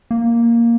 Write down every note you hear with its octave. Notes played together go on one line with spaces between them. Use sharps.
A#3